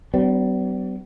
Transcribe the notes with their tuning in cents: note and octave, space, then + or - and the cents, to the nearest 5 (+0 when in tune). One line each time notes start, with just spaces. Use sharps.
G3 -45 B3 +40 D4 +0